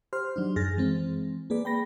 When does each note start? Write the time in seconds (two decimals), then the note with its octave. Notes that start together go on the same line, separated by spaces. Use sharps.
0.13 G4 C5 C6 F6
0.36 F#3 D4 D#4
0.56 F#2 G#4 F6 A6 A#6
0.77 E3 G#3 C4
1.50 A#3 G#4 B4 D5
1.65 G5 B5 A#6